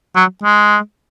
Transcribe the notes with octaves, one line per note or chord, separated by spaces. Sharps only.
F#3
G#3